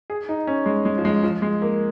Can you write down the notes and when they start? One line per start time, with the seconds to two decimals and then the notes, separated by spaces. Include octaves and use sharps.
0.10 G#4
0.29 D#4
0.47 C#4
0.66 G#3
0.85 G#3
0.98 F3
1.05 G#3
1.23 F3
1.42 G#3
1.62 A#3